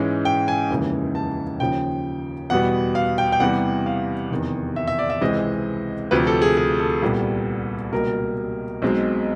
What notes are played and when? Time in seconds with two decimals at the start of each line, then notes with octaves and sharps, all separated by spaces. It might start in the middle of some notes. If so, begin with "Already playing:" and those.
Already playing: G#2 E3 G#3 C#4
0.25 G5
0.48 G#5
0.70 F1 D#2 C#3 E3 G#3
1.15 A5
1.60 D#2 C#3 F3 G5
2.50 E2 B2 G3 B3 F#5
2.95 F5
3.18 G5
3.32 G5
3.40 E2 C3 E3 G3 F#5
3.86 F5
4.31 F1 E2 C3 D#3
4.76 E5
4.88 E5
4.99 D5
5.10 E5
5.21 C#2 C3 E3 G#3 C4 D#5
6.11 D2 C3 F3 B4
6.27 A4
6.42 G#4
6.57 G#4
6.80 A4
7.02 C2 A#2 G3 B3
7.92 C#2 B2 G3 A#3 A#4
8.82 B1 B2 G#3 C4